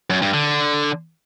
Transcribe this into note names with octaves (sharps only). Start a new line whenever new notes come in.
F#2
G2
D3